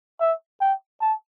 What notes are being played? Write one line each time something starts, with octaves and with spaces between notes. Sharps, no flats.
E5
G5
A5